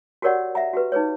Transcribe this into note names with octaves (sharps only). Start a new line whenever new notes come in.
F#4 G4 A#4 C#5 D5 F#5
E5 F#5 A#5
F#4 G4 B4
D#4 G#4 B4 C#5